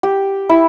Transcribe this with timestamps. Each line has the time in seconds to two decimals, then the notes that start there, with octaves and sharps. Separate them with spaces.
0.03 G4
0.49 E4